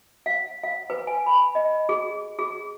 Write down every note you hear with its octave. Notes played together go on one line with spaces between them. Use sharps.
F5
F5
B4
G#5
B5
D#5
G#4
G#4